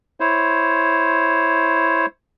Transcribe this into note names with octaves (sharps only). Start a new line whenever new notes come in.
E4 C5 C#5